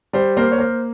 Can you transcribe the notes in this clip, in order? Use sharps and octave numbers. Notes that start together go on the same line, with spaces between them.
G3 C5
A#3 C5
C#5
A#3 C5